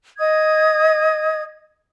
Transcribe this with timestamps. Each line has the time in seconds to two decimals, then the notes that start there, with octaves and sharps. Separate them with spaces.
0.18 D#5 D#6 G#6